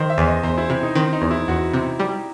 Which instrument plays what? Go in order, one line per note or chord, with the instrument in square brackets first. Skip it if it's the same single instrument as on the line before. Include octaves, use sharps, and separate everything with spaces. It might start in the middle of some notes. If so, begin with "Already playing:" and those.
Already playing: [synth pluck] D#3 [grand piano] C5
[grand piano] E5
[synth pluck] E2
[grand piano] D#5
[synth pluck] E2 [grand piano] C5
[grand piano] E4
[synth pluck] C3 [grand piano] E4
[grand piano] D#4
[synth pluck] D#3 [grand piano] C4
[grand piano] D#4
[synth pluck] E2
[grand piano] E4
[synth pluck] E2 [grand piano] F#4
[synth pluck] C3
G3